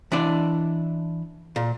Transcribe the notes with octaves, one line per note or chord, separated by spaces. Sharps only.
E3 D4 D5
A#2